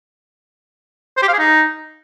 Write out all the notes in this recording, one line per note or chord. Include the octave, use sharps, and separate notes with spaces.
C5
G4
F5
G#4
D#4